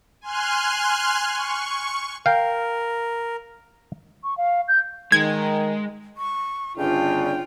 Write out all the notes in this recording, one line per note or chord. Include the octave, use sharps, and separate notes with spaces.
G#5 C6 F6 F#6
C#6
A#4 F5 G5
C#6
F5
G6
D#3 G#3 G#6
C#6
G1 C#3 D4 F4 G5